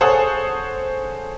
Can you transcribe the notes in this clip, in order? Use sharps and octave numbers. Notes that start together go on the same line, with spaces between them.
G#4 A4 C5 C#5 F#5 D#6